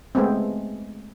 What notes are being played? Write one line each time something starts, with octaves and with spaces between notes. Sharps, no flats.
G#3 A3 B3 C4